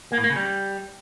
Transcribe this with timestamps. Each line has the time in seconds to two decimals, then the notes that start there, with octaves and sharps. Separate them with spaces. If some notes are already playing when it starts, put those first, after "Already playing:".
0.12 A#3
0.18 A2
0.24 A#3
0.30 C#3
0.36 G3